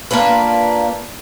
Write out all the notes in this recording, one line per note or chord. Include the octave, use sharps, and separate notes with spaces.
A#3 D4 F4 B4